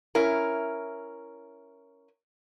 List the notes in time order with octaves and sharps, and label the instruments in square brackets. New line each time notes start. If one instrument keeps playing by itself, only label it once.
[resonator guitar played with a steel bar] C#4 E4 A#4